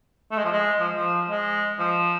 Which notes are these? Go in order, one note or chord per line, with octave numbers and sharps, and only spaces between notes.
A3
G#3
F3
G#3
F3
F3
G#3
F3